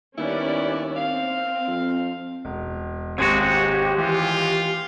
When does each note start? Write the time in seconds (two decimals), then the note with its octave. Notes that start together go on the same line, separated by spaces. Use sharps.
0.18 D#2 G3 B3 C#4 E4 D5
0.97 C4 F5
1.68 F2
2.45 E1
3.18 G#1 D#2 G#3 C4 F#4 G4 G#6
3.98 E3 F4